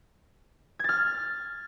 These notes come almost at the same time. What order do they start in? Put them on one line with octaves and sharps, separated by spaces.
G#6 A6 F6